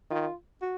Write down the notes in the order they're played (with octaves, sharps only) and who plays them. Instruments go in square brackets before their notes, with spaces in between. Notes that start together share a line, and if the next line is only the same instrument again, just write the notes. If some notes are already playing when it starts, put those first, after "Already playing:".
[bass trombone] D#3 [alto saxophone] F4
[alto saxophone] F#4